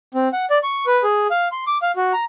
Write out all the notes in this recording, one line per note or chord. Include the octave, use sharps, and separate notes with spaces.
C4
F#5
D5
C#6
B4
G#4
F5
C6
D6
F5
F#4
A#5